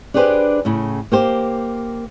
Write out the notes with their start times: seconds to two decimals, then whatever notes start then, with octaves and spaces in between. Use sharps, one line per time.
0.14 D4 G4 G#4 B4 C5
0.65 A2 C#3
1.12 A#3 G4 C5